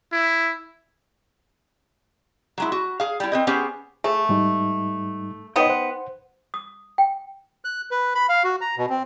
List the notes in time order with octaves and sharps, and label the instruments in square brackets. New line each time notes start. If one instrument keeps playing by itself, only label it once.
[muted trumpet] E4
[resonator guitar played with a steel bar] F#3 G#3 E4
F#4
G#4 F5
G3 E4
C4 B4 D#5
B3 C#4 G4 G#4 C5
[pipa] A3 [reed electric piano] G#4
[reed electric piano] G#2 G3 D#4
[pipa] B3 D#4 G5 [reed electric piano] B4 C#5 D#5
[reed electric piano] C5 F#5
[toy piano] D#6
G5
[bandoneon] F#6
B4
B5
F5
F#4
A#5
B2
C4